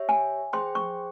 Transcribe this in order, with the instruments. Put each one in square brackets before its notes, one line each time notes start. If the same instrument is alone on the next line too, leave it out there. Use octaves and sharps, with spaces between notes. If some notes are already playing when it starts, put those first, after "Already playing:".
Already playing: [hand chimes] G4 C#5 E5
[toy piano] G#5
[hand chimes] G#4 C5 G5 [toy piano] C6
[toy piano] C#6